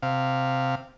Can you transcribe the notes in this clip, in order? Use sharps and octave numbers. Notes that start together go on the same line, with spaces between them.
C3 F5